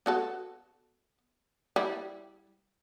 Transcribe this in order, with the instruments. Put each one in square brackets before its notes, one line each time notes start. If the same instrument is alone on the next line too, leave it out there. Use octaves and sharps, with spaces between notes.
[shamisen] B3 F#4 A4
G3 E4